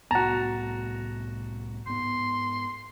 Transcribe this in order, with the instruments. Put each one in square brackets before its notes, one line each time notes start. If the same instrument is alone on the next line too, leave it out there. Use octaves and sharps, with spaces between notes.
[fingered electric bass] C2 A2 B3 [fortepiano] F#4 A5 [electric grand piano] A#5
[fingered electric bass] G#2 B3 [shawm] C6